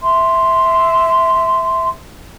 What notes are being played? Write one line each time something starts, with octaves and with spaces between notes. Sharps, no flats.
E5 C6